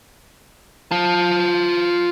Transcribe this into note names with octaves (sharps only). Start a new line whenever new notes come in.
F4 A5